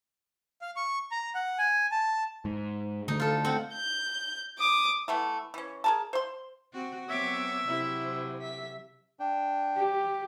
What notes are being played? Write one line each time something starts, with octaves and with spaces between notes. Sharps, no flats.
F5
C#6
A#5
F#5
G#5
A5
G#2
D3 A3 D#4
F4 A4
C4 F#5
G6
D6 D#6
E3 A3 B3
E3 C#4
G#4 A#4 A5
C5 C6
C4 F#4
F#3 B3 C4 C#5 E5 D6
C3 F#3 E4 C5
E5 B6
D4 G5
G4